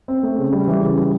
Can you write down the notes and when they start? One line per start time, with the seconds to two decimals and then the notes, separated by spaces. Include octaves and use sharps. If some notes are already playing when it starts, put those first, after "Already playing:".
0.08 C4
0.23 A3
0.38 C#3
0.53 G3
0.68 E3
0.83 C#3
0.97 G3